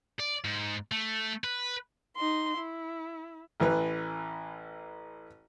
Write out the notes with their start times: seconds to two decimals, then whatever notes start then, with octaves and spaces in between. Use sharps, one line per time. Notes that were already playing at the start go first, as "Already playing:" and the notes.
0.20 D5
0.44 G#2
0.92 A3
1.44 B4
2.17 D#4 C6
2.57 E4
3.60 A1 E3 B4